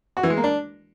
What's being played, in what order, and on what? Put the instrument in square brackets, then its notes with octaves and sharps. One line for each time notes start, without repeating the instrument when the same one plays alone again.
[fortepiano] F#4
E3
G#3
A#3
D4